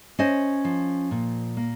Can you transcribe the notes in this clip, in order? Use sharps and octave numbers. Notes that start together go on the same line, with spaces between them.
C#4 C5 D#5
F3
A#2
A#3